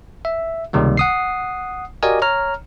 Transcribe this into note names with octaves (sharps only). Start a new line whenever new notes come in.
E5
C#2 C3 D#3 G3 A#3
F#5 D#6 C7
F#4 G4 A#4 D5 D#5 G#5
C#5 A#5 F6